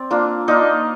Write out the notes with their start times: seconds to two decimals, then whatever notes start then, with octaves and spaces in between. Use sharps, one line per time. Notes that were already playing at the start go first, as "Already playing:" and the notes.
Already playing: C4 D5
0.11 A#3 D4 F4
0.48 A#3 D4 D#4 F4 D#5